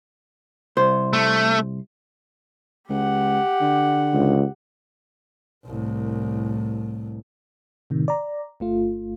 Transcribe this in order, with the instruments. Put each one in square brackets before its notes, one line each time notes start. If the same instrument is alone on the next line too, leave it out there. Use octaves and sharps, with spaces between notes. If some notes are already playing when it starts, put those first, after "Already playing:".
[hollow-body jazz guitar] C2 C5
[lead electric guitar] A3
[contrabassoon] C#2 [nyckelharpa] G4 F#5
[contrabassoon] D3
[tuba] C#2
[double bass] C2 A2
[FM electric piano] A2 C3 D#3
D5 A#5
G1 A3 F4